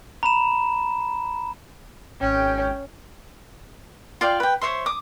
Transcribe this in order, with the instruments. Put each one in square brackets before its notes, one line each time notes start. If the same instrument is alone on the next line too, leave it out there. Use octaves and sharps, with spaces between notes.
[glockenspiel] A#5 B5 E7
[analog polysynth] G#1 G5 [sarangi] C#4
[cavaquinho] F4 D5 F5 G5
B4 G5
C5 C#5 E5 C6
D6 D#6